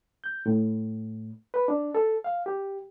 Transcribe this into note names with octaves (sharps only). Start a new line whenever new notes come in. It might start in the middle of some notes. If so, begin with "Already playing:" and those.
G6
A2
B4
D4
A4
F5
G4